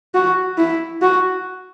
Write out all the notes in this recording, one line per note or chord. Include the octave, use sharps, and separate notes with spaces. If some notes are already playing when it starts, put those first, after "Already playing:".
F#4
E4
F#4